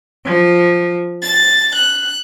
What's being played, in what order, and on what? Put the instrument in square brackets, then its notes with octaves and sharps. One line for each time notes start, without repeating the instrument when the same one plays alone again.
[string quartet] F3
A6
F#6